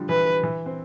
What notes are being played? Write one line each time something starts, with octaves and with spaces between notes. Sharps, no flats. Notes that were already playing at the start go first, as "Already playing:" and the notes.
Already playing: D3 F3 G3
E3 B4
E3
C4